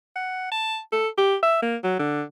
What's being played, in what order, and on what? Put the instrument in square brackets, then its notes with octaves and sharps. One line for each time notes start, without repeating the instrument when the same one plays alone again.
[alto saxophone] F#5
A5
A4
G4
E5
A#3
F#3
D3